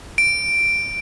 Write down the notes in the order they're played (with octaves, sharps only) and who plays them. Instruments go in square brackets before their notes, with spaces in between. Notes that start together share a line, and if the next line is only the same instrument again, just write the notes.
[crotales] D7